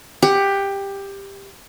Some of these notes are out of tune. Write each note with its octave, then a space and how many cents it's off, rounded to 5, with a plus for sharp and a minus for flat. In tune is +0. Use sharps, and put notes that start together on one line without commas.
G4 +15 F#5 +30